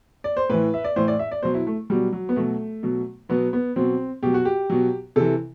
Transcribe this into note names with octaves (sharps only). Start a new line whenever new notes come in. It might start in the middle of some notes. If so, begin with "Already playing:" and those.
D5
C5
A2 E3 B4
E5
D5
A2 E3 C5
D5
E5
D5
B2 F#3 C5
E4
A3
B2 F#3 G3
F#3
B3
B2 F#3 A3
B2 F#3
B2 F#3 B3
B3
B2 F#3 C4
B2 F#3 G4
F#4
G4
B2 F#3
C3 E3 A4